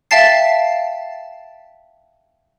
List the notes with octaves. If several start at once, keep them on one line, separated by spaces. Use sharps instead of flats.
E5 F5 G5 A5 A6 C7